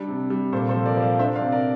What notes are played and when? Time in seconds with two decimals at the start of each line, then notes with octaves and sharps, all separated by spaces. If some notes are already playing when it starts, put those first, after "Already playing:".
Already playing: G3 D4
0.08 C3
0.30 G3
0.52 A#2 A4 C5
0.69 A4 C5
0.74 F3
0.86 A#4 D5
0.97 F3
1.02 D5 F5
1.19 D4 C5 E5
1.36 D5 F5
1.42 C3
1.52 A#4 D5